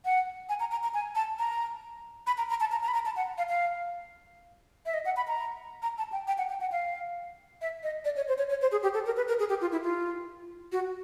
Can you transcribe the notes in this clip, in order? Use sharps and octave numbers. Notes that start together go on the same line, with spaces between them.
F#5
G#5
A#5
A#5
A#5
G#5
A5
A#5
B5
A#5
A#5
A5
A#5
A#5
B5
A#5
A5
F#5
F5
F5
E5
D#5
F#5
B5
A#5
A#5
A5
G5
G5
F#5
G5
F#5
F5
E5
D#5
D5
C#5
C5
C#5
C#5
C5
G#4
G4
A4
A#4
B4
A#4
G#4
G4
F4
E4
F4
F#4